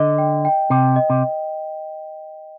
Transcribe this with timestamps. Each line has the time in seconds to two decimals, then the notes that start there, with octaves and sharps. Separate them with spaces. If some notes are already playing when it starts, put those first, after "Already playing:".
Already playing: D3 D#5
0.18 G5
0.45 G5
0.70 C3 G5
0.96 D#5
1.10 C3